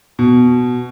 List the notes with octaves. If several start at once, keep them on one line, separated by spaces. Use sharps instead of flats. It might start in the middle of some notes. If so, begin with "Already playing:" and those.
B2